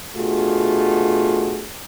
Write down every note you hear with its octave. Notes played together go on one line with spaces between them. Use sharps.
B2 A3 D4 F4 F#4 G#4